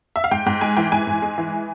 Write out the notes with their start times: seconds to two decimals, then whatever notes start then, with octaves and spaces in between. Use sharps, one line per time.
0.16 E5
0.24 F5
0.31 G#2 G5
0.46 G#2 G5
0.61 G#3 G#5
0.77 E3 G5
0.92 G#2 G#5
1.07 G#2
1.22 G#3
1.38 E3